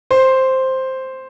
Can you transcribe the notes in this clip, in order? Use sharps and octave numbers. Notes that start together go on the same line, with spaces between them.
C5